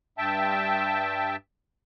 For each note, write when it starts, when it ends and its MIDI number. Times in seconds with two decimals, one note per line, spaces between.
0.18 1.36 43
0.18 1.36 76
0.18 1.36 79
0.18 1.36 81